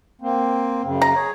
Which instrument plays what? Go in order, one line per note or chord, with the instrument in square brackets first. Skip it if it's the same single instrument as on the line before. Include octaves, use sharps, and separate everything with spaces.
[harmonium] A#3 C4
F#2 C#3
[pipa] A#5
[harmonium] G#4 C#5